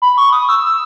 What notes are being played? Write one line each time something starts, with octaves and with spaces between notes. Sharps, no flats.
B5
C#6
D#6
E6
E6